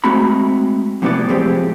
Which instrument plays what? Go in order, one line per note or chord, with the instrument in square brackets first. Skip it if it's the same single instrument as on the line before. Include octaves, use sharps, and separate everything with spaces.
[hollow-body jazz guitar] G#3 A3 C4 F#4 A#5 B5
F#2 A2 C3 B3 E4 D5
A2 F3 G#3 C4 G4